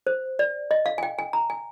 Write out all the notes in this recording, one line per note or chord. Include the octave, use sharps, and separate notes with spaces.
C5
D5
D#5
F5
G#5
G5
G#5
A#5
G#5